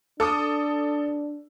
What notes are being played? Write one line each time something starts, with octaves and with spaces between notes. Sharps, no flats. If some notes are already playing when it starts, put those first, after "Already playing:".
D4 A4 D6 D#6